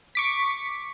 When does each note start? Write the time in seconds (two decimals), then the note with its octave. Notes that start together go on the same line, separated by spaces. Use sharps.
0.15 C#6 D6 B6